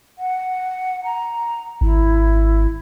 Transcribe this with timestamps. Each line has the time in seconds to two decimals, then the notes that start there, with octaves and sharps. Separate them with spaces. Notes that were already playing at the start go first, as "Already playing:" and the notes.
0.18 F#5
1.05 A#5
1.81 G#1 E4